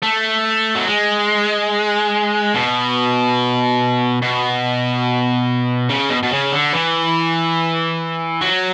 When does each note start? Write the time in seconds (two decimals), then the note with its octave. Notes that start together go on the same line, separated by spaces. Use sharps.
0.03 A3
0.75 F#3
0.87 G#3
2.54 B2
4.22 B2
5.90 C#3
6.10 B2
6.23 B2
6.31 C#3
6.53 D3
6.73 E3
8.41 F#3